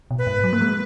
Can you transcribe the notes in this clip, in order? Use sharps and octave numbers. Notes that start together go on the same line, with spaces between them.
B2
B4
G#2
F#3
A#3
G#3